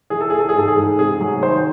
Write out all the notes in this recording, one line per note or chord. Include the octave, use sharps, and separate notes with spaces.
E3 G#4
A4
E3 G#4
A4
G#4
G#2 A4
G#4
G#2
C3 G#4
F#3
D#3 C5